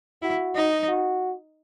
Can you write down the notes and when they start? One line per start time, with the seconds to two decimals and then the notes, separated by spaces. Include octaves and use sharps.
0.22 E4 F#4
0.55 D#4
0.88 F#4